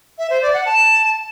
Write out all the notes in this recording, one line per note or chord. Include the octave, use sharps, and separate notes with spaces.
E5
C5
D5
F#5
A5